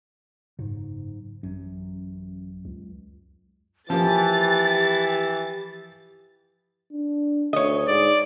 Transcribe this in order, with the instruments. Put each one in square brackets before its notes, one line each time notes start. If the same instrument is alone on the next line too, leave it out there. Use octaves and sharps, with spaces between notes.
[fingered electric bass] F#1 [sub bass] G#2
[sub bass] A1 [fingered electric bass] F#2
[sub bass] C#2
[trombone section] E3 [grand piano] F3 A#3 [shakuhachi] G4 [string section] A6
[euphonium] D4
[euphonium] D2 [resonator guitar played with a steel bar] C#5 D#5
[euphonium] G#2 [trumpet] D5